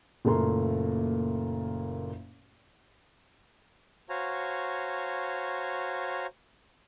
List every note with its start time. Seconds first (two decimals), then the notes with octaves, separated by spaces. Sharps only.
0.25 F#1 A#2 A3 A#3 A#5 C6
4.09 F#4 C5 C#5 F5 G#5 A#5